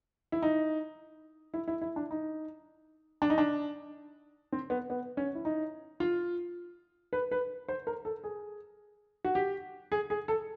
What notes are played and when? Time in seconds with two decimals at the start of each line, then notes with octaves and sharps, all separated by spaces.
0.32 E4
0.42 D#4
1.54 E4
1.68 E4
1.82 E4
1.96 D4
2.11 D#4
3.22 D4
3.30 D#4
3.38 D4
4.52 C4
4.70 B3
4.90 B3
5.17 C#4
5.35 E4
5.45 D#4
6.00 F4
7.13 B4
7.31 B4
7.68 C5
7.87 A#4
8.05 A4
8.24 G#4
9.25 F#4
9.35 G4
9.92 G#4
10.10 G#4
10.28 A4